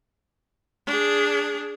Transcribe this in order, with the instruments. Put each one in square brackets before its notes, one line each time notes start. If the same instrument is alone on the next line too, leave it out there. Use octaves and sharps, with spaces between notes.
[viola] D4 G#4